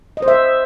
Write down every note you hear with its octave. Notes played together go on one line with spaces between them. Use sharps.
D#5
C5
E5